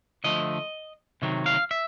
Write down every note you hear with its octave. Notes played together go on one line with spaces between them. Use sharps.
D3 F3 A3 D#5
C3 D#3 F#3
F5
E5